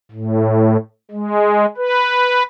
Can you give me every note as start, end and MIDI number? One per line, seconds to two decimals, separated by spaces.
0.11 0.77 45
1.11 1.66 56
1.78 2.43 71